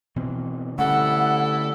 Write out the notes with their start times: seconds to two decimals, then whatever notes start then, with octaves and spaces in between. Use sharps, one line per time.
0.16 B2 E3 C4
0.79 D3 G3 A3 C#4 E4 A4 F#5